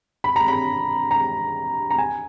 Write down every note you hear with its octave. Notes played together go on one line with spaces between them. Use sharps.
B5
A#5
B5
A#5
A#5
G#5